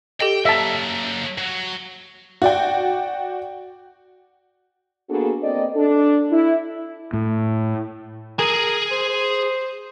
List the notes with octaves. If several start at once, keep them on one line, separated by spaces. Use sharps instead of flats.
G4 A4 D#5 G5
F#3 A#3 E5 A5
F#3
F#4 D5 G5
A#3 B3 D4 F#4 G#4 A4
A#3 C4 A4 D5 D#5
D4 A4
E4
A2
G#4 A#4 G#5
C5
C5